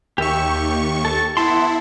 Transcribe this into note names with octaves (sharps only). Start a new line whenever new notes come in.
D#2 G4 E5 C#6
A4 A5
B3 E4 A5 C6